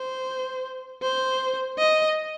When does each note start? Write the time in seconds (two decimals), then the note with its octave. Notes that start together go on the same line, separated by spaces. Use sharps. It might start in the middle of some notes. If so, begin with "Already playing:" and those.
Already playing: C5
1.02 C5
1.79 D#5